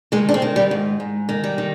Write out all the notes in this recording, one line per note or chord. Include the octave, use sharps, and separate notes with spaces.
D#3 G#3
D4
C4
D#3
G3
G#2
G#2
D#3
G3
D#3